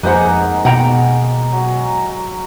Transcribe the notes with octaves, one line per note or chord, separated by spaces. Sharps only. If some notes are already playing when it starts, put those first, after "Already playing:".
F2 D#3 G#3 A#3 B4 C5 F#5
B2 F#5 G5 A#5
F#3